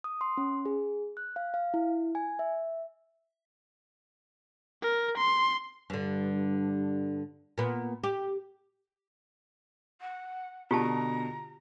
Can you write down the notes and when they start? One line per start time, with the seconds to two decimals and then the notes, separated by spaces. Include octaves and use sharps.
0.04 D#6
0.21 C6
0.37 C#4
0.66 G#4
1.17 F#6
1.36 F5
1.54 F5
1.74 E4
2.15 G#5
2.39 E5
4.82 A#4
5.18 C6
5.90 G2 D3
7.58 A#2 B3
8.04 G4
10.00 F#5
10.71 B2 D3 F4 G4 A5 A#5